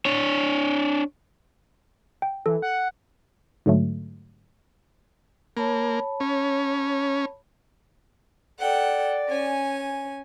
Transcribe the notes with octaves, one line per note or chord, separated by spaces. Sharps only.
D4 C#5
G5
E3 A4
F#5
G#2 D3 F#3 A3
A#3 C#5 A5 B5
C#4
A4 D5 F#5 G5
C#4 G#5